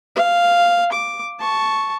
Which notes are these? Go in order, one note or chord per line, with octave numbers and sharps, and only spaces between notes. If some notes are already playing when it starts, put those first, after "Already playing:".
F5
D6
A5 C#6